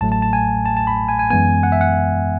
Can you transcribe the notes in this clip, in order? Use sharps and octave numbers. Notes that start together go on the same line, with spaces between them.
A1 A2 F#3 A3 A5
A5
A5
G#5
A5
A5
B5
G#5
G#5
F#2 E3 G#3 B3 G#5
F#5
E5
F#5